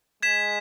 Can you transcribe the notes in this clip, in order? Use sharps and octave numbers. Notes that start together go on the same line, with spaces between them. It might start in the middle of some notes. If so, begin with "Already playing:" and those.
G#3 G#6 B6 E7